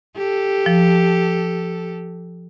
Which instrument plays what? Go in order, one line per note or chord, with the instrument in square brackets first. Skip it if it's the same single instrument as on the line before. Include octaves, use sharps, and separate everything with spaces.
[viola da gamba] G4 A4
[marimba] F3